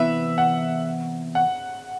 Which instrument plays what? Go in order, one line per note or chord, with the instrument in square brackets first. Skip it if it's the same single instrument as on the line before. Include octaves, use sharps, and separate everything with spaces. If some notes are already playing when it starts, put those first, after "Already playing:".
Already playing: [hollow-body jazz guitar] C3 E3 B3 E4 B4 [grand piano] E5
[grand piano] F#5
F#5